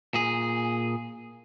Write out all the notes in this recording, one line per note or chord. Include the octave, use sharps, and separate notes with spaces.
A#2 G#4